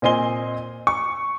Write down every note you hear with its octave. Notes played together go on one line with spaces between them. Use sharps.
A#2 C4 D#5 G#5 C6 G7
C#6